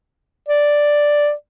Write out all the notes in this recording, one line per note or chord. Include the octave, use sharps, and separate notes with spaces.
D5